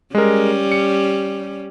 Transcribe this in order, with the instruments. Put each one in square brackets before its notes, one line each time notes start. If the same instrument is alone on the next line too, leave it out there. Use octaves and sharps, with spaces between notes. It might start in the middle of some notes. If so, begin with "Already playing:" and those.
[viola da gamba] G3 C#4 [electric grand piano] G#3 A#4
[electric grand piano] C#7